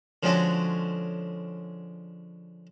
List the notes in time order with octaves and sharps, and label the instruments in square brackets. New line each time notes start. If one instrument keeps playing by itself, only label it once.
[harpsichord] D3 F3 G#3 C#4 D4 F#4